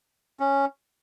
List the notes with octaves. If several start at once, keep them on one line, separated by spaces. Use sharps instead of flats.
C#4